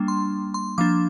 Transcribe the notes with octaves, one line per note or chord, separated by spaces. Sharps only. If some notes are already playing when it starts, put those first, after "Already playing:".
Already playing: G3 A#3 D4
C6
C6
F3 A#3 D4 D6